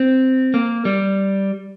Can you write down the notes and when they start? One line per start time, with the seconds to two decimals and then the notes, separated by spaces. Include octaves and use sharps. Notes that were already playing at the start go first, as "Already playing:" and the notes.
Already playing: C4
0.54 A#3
0.85 G3